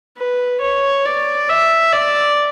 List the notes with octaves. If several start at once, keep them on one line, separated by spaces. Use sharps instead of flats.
B4
C#5
D5
E5
D5